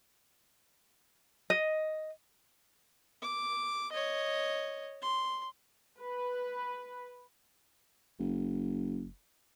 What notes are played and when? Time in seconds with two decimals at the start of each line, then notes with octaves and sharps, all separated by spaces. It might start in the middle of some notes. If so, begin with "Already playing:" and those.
1.50 D#5
3.22 D6
3.92 C#5 D#5
5.02 C6
5.99 B4
8.19 F#1